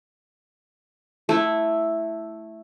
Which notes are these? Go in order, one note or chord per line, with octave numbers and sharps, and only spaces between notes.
A3 E4